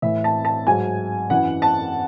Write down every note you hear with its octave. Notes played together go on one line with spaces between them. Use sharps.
A2 E3 E5
A5
A5
G#2 F#3 G#5
F#2 E3 F#5
A5